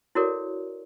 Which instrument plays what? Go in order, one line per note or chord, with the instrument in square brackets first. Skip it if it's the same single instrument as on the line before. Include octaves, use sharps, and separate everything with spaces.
[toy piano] E4 F#4 A4 A#4 C#5 D5